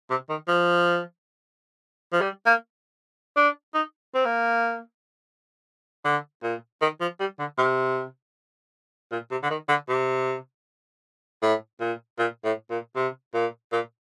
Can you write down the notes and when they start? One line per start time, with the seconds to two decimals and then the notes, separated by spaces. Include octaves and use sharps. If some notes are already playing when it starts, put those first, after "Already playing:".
0.10 C3
0.30 D#3
0.48 F3
2.13 F3
2.21 G3
2.46 A#3
3.36 D4
3.74 D#4
4.15 C4
4.25 A#3
6.05 D3
6.43 A#2
6.82 D#3
7.01 F3
7.20 G3
7.39 D3
7.58 C3
9.12 A#2
9.31 C3
9.43 D3
9.50 D#3
9.69 D3
9.89 C3
11.42 A2
11.81 A#2
12.19 A#2
12.44 A2
12.70 A#2
12.96 C3
13.34 A#2
13.72 A#2